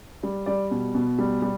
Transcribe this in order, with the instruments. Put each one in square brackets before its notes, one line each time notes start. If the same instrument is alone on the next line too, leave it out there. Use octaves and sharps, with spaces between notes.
[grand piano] G3 D5
G3 D5
B2
B2
G3
G3